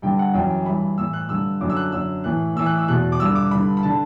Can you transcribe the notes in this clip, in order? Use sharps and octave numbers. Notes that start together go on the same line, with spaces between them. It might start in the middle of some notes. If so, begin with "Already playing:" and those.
G2 D3 G5
F#5
F#2 E3 G5
G2 E3 B5
A2 E3 E6
F#6
G2 D3 E6
F#2 D3 D6
E6
F#6
F#2 D3 E6
A2 E3 F#6
A2 E3 E6
F#6
E6
E2 B2 F#6
D6
G2 D3 E6
D6
G2 D3 B5
B5
D3 A5